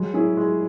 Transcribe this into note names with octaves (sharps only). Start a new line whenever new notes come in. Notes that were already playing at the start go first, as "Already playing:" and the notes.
Already playing: F#3 G#3
C#4 E4 G#4
G#3